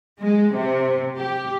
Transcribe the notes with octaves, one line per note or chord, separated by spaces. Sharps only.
G#3
C3
G4